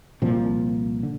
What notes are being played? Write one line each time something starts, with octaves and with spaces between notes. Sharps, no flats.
C2 A#2 F3 C4
D3